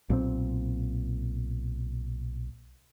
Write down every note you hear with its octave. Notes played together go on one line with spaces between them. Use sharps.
B1 A#2 D3 C4